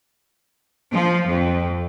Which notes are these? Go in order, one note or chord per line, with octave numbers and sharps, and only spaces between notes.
F3
F2